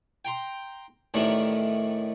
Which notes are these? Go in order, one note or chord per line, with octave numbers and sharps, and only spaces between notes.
G5 A#5 C6
A1 A2 D#3 D4 E5 A#5